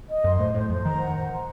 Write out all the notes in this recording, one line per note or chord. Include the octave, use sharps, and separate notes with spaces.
D#5
F#2 C6
A2 C5
A2 C5
F2 C5
D#3 A#5
F#5
C5
C5